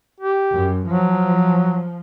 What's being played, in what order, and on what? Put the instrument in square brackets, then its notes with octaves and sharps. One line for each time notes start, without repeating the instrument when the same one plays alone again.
[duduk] G4
[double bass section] F#2
[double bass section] F3 [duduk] F#3